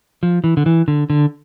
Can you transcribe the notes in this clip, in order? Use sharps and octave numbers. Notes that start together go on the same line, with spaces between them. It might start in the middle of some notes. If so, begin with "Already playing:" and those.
F3
E3
D3
E3
D3
D3